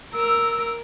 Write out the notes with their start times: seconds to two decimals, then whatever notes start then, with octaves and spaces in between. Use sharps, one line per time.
0.14 A#4 E6